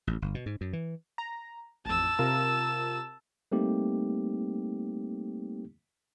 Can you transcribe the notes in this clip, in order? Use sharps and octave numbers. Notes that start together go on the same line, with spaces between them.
A1
G1
B2
G#2
F#2
E3
A#5
A1 F2 A5 E6
C3 F4 A#4
G3 A3 A#3 C4 D#4 G4